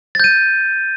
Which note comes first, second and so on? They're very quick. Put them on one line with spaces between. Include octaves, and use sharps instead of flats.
A6 G6 D#7